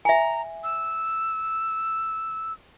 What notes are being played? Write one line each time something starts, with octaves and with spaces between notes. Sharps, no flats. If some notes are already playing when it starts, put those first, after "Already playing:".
E5 G#5 A#5
E6